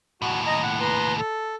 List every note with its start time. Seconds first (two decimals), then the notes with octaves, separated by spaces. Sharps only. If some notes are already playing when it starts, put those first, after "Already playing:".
0.22 D#2 A2 F#4
0.47 D#5 A#5
0.63 F#5
0.81 B4 A#5 C6
1.19 A4